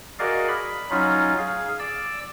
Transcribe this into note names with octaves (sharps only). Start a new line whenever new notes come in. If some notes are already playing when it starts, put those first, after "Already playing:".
F#4 G#4 A#4 D5 D#5 F5
B5
F#3 C#4 D#4 F4
G#4 F5
D5 E6